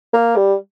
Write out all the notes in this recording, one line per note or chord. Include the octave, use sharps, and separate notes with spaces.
A#3
G3